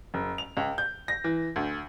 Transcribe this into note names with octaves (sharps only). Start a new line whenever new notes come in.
F#1
F7
C#2
G6
A#6
E3
D2